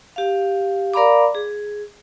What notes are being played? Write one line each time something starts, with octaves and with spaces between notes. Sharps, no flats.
G4 F5
A#4 D5 F5 A#5 B5 D6
G#4